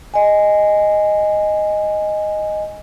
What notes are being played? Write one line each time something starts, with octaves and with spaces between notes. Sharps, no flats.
D#5 G#5